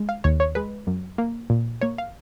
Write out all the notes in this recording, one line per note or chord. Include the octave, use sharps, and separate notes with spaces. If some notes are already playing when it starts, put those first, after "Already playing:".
Already playing: G#3
F5
D#2 C#5
C#5
G#3 B4
F#2
A#3
A#2
A#3 C#5
F5